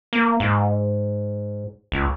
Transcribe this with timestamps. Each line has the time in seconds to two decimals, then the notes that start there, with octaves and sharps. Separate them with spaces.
0.13 A#3
0.40 G#2
1.92 C#2